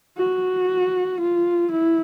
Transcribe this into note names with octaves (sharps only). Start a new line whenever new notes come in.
F#4
F4
E4